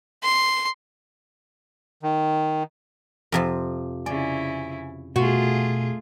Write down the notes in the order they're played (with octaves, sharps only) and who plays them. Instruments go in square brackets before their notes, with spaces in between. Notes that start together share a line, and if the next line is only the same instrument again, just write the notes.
[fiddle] C6
[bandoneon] D#3
[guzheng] F2 C3 F3
[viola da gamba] C#3 E4 [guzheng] D5 [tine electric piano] G#5
[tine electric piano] B2 [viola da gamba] A3 F4 G#4 [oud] F#4